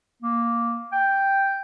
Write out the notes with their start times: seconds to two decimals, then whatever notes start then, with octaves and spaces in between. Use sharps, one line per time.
0.22 A#3
0.92 G5